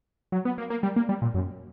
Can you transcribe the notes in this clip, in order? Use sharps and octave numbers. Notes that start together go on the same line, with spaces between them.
F#3
B3
A#3
A#3
G3
A#3
G3
A#2
F#2